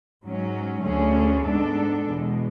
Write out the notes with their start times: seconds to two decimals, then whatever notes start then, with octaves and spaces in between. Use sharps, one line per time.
0.25 G#2 F#3 C#4
0.84 D2 D3 A3 C#4 G#4
1.45 G#2 G#3 B3 D4 A4
2.06 E2 B2 G#3